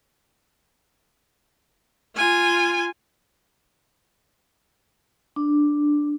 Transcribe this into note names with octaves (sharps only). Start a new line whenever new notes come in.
F4 G#5
D4